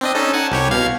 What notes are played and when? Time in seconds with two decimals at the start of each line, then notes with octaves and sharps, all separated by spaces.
0.01 C4 D4 D#5
0.15 C#4 D#4 A4
0.33 F#5 G#5 A5
0.51 C2 G4 C#5
0.71 B2 F5 G#6